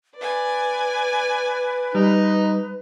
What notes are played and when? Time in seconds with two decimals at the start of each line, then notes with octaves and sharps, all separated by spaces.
0.17 B4 D5 G#5
1.95 G3 D#4